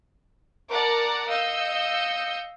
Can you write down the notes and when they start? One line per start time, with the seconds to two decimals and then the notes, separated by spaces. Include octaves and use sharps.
0.71 A#4 D5 F#5 A5 A#5 D6
1.30 D#5 F5 E6 G6 C#7